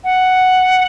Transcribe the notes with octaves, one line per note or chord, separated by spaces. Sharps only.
F#5